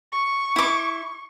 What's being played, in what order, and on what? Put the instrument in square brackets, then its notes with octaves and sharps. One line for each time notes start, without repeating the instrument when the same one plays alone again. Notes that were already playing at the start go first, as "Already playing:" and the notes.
[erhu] C#6
[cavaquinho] E4 D6